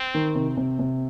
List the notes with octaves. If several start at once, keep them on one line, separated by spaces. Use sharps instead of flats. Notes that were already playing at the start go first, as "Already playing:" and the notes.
Already playing: C4
D#3
C3
C3
C3